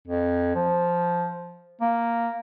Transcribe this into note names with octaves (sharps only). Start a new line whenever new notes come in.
F2
F3
A#3